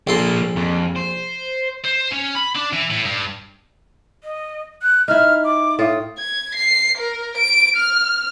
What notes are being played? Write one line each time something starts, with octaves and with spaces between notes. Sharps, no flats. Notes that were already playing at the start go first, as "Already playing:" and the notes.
A#1 F3 A#3 A4 C6
F2
C5
C5
C#4
B5
D4
E3
A2
G2
D#5
F#6
D#4 E4 F6
D6
A2 F4 D#6
G#6
C7
A#4
D7
F6